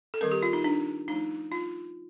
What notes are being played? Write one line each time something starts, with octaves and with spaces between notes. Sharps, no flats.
A4
D#3 G3 C4 A#4
G4
F4
D#4
D4
F3 A3 D4 D#4
F4